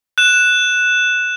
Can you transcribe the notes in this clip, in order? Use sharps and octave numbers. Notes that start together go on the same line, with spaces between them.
F#6 E7